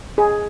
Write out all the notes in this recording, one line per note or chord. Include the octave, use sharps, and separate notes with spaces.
G#4